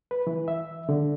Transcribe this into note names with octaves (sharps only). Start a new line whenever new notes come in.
B4
E3
E5
D3